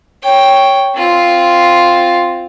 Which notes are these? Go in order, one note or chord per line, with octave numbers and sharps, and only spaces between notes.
C#5 G5
C4 F4